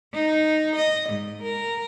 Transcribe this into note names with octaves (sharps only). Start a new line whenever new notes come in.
D#4
D#5
G#2
A#4